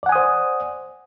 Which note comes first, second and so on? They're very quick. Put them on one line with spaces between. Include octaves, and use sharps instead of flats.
D5 F#5 G#5 D#6 C5